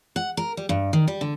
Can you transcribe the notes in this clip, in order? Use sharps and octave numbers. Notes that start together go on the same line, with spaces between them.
F#5
A#4
G3
G2
D#3
G3
D3